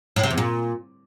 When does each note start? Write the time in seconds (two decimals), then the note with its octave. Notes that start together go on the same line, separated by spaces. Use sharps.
0.16 A2
0.23 C3
0.30 E2
0.38 A#2